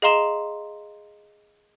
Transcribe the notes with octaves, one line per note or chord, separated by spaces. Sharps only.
G#4 D#5 F5 A#5 C6 E7